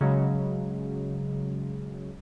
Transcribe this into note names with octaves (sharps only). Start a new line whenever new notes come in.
C#3 F#3 G#3